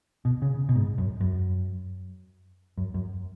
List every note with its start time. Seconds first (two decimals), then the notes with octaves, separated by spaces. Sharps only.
0.25 B2
0.42 C#3
0.69 B2
0.75 G#2
0.98 F#2
1.21 F#2
2.77 F#2
2.94 F#2